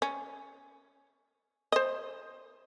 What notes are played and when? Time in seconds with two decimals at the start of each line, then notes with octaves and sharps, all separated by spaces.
0.02 C#4
1.72 C5 D#5